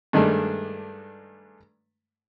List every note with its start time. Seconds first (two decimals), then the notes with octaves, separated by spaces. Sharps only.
0.13 G2 D#3 G#3 A3 D4